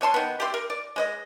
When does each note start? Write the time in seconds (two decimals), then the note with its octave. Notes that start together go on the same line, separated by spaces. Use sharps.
0.01 B2 C#5 A5 C6
0.14 D#3 B3
0.40 G4 D5 E5 C6
0.54 A#4
0.70 D5
0.96 G#3 C5 D#5